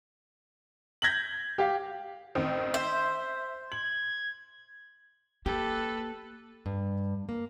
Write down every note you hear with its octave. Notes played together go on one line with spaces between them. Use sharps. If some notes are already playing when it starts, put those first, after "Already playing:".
G6 G#6 A#6 B6 F#7
G4 F5
A1 D#3 C4
C5 E5
G#6 F#7
A#3 G4 A4 B4
G2
A#3